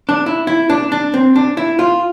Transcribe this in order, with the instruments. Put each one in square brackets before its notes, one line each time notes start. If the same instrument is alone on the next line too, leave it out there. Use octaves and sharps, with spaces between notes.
[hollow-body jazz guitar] D4
E4
E4
D4
D4
C4
D4
E4
F4